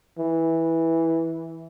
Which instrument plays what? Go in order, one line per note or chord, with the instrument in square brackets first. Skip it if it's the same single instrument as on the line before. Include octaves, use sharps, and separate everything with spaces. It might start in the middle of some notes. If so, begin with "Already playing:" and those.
[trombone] E3